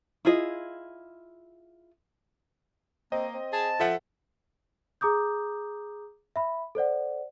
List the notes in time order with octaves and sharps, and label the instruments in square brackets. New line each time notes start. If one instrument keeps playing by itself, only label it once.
[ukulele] E4 F4 G#4 D#5
[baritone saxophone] A#3 [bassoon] C4 [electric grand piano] D#5
[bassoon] C4
[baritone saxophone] G#4 [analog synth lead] A5
[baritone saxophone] F3 [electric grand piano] A4 E5 F#5
[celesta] G#4 A#5 D6 D#6 G6
E5 B5
A4 C5 D5 F#5